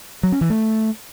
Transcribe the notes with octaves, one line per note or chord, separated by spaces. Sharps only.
F#3
C#4
E3
A3